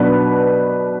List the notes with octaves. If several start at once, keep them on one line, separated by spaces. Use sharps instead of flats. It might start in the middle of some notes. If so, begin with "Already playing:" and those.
Already playing: B2 F#3 B3 D4 B4